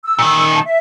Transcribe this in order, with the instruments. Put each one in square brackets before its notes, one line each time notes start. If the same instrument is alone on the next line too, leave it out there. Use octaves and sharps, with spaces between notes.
[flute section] E6
[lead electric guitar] A#2 D#3
[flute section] A5
E5